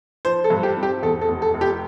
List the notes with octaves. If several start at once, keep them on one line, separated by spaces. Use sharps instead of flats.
F3 C5
A4
G2
G4
C4
G4
E2 A4
A4
F1
A4
F1
G4